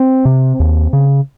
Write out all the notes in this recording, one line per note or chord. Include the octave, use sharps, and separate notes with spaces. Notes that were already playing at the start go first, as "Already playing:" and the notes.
Already playing: C4
C3
D#2
C#3